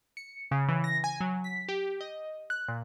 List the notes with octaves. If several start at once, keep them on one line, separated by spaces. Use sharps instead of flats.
C#7
C#3
E3
A#6
G#5
F#3
B6
G4
D#5
F#6
A#2